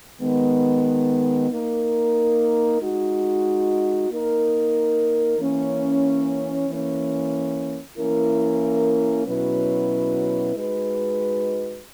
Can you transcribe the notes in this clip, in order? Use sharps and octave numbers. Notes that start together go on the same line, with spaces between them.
D#3 G#3 B3
A#3 D#4 A#4
G#3 D#4 F#4
A#3 D#4 A#4
E3 A#3 C#4
E3 A#3 C#4
E3 A#3 C#4 E4 A#4
B2 F#3 C#4 E4 B4
G#3 D#4 F#4 B4